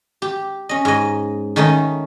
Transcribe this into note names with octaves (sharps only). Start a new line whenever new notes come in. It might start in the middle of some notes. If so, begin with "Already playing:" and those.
G4
C#4 D#5
G#2 D#5
D#3 A3 C#4 D#4